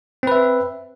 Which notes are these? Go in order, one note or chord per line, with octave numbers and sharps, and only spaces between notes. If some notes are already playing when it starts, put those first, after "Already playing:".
C4 B4 E5